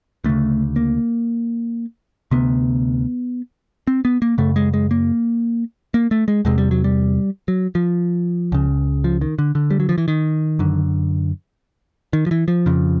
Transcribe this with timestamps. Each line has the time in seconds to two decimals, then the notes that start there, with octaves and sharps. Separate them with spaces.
0.24 D2 C#3 A3
0.76 A#3
2.31 D2 C3 B3
3.87 C4
4.05 B3
4.22 A#3
4.38 F#2 C#3 A3
4.56 G#3
4.74 G#3
4.91 A#3
5.94 A#3
6.11 A3
6.28 G#3
6.45 E2 C3 G#3
6.58 G3
6.71 F#3
6.84 G3
7.48 F#3
7.75 F3
8.52 C#2 C#3
9.04 F3
9.21 D#3
9.39 D3
9.55 D3
9.71 G3
9.80 F#3
9.89 F3
9.98 E3
10.08 D#3
10.59 F#2 D3
12.13 D#3
12.26 F3
12.31 E3
12.48 F3
12.66 F2 C#3